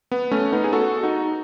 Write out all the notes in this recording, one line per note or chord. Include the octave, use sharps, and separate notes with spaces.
B3
A3 C#4
B3 D#4
G#4
F#4 A4
D#4 F#4